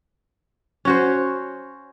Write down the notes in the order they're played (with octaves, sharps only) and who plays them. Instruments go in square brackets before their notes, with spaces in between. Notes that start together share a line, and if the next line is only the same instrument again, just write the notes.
[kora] C#4 F#4 C5